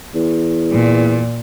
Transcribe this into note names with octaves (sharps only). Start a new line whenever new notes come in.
E2
A#2